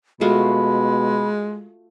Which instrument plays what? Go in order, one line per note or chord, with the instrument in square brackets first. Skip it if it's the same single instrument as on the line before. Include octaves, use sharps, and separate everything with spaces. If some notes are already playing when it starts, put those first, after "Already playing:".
[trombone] B2 [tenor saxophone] G#3 [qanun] A3 F4 F#4 [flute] B5